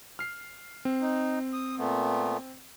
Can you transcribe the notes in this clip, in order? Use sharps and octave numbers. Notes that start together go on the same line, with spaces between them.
F6 C7
C4
D#4
D#6
A#2 A3 B3